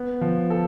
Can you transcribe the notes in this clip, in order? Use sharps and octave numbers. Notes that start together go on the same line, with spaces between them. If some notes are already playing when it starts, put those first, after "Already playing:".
Already playing: B3
F3
A4